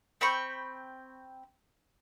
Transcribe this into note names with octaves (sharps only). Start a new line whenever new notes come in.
C4 G5 B5 C#6